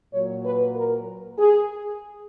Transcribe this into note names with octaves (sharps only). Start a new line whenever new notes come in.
A#2 F#3 C#5
B4
A#4
G#4